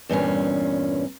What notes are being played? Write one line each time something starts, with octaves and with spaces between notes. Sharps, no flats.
E2 G2 A#2 C#4